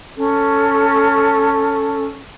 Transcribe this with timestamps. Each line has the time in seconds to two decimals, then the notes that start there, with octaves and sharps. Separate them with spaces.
0.16 C#4 A4